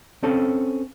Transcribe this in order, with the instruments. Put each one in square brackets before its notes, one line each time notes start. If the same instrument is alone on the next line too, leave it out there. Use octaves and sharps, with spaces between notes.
[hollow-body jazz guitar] C4 C#4 A4